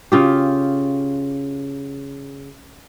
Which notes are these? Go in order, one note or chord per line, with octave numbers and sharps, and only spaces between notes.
C#3 F4 G4